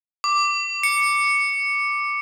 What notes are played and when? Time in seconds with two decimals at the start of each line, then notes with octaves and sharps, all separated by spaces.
0.24 D6
0.83 C#7